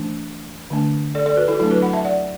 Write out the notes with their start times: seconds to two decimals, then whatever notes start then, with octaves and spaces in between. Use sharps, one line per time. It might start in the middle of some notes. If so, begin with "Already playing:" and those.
Already playing: E3 A3 D4
0.70 D3 A3 D4
1.15 A4 D5
1.26 A4 D5
1.37 F#4 B4
1.48 E4 A4
1.55 F#4
1.60 F#3 A3 D4 E4 A4
1.71 F#4 B4
1.82 F#5 B5
1.93 E5 A5
2.04 D5 F#5